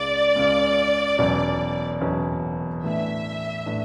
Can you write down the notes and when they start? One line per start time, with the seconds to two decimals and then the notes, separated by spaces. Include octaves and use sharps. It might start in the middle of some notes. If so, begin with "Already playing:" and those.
Already playing: C#2 C#3 G#3 D5
0.35 C#2 C#3 G#3
1.18 E1 E2 B2 F#3 C#4
2.01 E1 E2 B2 F#3 C#4
2.84 A1 A2 E3 A3 D4 E5
3.66 A2 E3 A3 D4